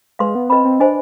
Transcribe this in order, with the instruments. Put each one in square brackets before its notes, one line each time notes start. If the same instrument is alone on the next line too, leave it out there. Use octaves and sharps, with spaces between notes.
[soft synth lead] G#3 [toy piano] B4 F5 C6
[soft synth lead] B3
[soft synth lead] C4 [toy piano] B4 D#5 B5
[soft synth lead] C4
[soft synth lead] D4 [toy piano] C5 D#5 G#5